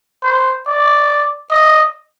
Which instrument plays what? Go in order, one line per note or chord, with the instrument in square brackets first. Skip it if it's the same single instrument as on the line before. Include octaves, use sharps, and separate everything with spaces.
[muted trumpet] C5
D5
D#5